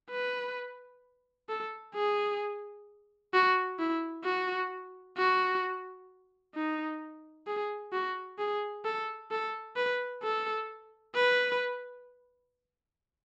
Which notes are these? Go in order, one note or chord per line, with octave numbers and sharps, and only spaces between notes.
B4
A4
G#4
F#4
E4
F#4
F#4
D#4
G#4
F#4
G#4
A4
A4
B4
A4
B4